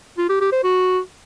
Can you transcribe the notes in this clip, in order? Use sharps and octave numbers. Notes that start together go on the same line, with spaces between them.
F4
G4
G4
C5
F#4